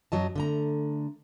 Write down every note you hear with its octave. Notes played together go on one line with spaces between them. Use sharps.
F#2 F#3 D#5 A5
D3 A3 A#5